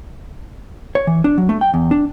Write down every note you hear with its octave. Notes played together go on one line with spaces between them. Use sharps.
C#5
E3
D4
F#3
A3
G5
E2
D4